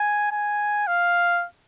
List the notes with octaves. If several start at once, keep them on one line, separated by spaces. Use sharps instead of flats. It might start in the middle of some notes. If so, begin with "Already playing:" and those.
Already playing: G#5
G#5
F5